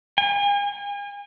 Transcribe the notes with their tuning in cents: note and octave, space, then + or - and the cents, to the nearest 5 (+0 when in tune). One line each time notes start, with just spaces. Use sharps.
G#5 -40